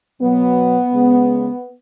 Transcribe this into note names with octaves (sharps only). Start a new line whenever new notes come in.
B2 F#3 B3
C#3 G#3